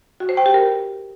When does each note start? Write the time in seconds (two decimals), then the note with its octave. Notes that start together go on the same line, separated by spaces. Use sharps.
0.20 F#4
0.29 C5
0.37 G5
0.46 G4
0.54 A#4